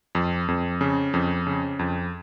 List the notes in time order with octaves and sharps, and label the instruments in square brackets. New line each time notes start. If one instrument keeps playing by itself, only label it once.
[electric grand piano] F2
F2
C#3
F2
C#3
F2